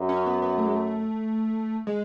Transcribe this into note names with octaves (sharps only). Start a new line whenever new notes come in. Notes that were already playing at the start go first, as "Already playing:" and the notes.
Already playing: F#2
C#4
B3
B3
A3
G#3
A3
G#3